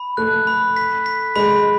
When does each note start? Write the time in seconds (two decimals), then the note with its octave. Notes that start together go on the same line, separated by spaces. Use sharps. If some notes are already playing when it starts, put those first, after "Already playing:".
Already playing: B5
0.17 A3 F#6
0.47 B5
0.76 B6
1.06 B6
1.36 G#3 B5